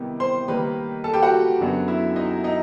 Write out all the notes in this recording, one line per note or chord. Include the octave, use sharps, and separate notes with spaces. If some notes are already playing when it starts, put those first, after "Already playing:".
Already playing: C3 D#3 G3 B3 E4
C5 C6
D#3 G3 A#3 B4 B5
A4 A5
G4 G5
F#4 F#5
F#2 D3 F#3 B3
E4 E5
D#4 D#5
D#4 D#5